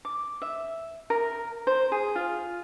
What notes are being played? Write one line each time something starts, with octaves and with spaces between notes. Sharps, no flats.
D6
E5
A#4
C5
G#4
F4